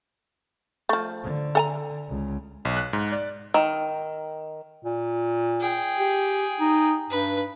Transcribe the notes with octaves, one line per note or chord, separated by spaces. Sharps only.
F3 A3
D3
A4 G#5 A#5
C#2
B1
F#6
G#2
D5
D#3
A#2
G#4 G5
G4
D#4
G2 B4